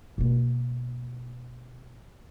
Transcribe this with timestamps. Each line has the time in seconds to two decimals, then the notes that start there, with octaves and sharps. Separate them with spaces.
0.18 B2 A#3